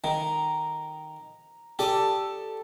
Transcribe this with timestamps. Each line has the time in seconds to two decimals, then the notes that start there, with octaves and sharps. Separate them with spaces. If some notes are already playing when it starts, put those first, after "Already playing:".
0.04 D#3 A#5
1.79 G4 A4 D5 D#6